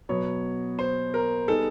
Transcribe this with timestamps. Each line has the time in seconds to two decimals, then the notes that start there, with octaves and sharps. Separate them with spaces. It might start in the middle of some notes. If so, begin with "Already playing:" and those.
0.09 B2 F#3 B3 C#5
0.79 C5
1.14 A#4
1.48 G3 B3 D#4 G#4 A4